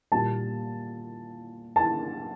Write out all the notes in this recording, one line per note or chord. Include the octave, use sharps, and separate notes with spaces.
A#2 G3 A5
A5